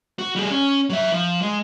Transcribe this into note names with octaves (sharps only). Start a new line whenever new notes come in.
F#4
G3 G#4
C#4
F#3 E5
F3
G#3